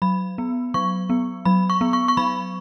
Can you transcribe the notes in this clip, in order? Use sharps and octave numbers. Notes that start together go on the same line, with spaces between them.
F#3 B5
B3
F#3 C#6
B3
F#3 B5
C#6
B3
C#6
C#6
F#3 B5